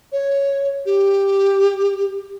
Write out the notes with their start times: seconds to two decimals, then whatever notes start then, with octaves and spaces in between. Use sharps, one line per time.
0.12 C#5
0.86 G4